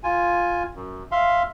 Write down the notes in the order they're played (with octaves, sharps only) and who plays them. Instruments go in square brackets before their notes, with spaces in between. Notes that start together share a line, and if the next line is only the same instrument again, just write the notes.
[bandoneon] F4 G#5
F#2
E5 F5 C6